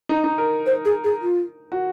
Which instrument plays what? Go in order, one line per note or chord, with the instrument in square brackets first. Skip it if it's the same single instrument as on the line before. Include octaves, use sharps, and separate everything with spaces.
[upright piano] D#4
D#4
A#4
[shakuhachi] C5
G#4
G#4
F4
[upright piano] F#4